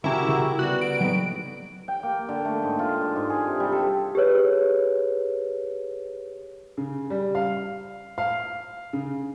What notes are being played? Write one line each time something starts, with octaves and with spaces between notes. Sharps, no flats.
C2 C#3 E4 F#4 G4 A#4 A#5
C#3
D3 G3 B3 F#4
D7
A2 F#3 G3 B3 D#4
G5
A#3
D3
A3
G#2
F4
D4
G#2
G#4
C3
G3
A4
G4 G#4 B4 C#5
C#3
G3
F5
F5
C#3